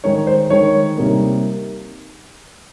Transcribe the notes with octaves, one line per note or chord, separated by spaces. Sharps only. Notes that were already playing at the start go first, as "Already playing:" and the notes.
D#3 G#3 D#4 C#5
C5
D#3 G#3 D#4 C#5
C3 G3 A#3 D#4